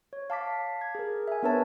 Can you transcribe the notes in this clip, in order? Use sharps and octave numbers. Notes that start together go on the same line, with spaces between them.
C#5
F5 A5 D6 B6
G#6
G#4 A#4
E5 G#5
B3 D4 A#4 B4 C#5 A5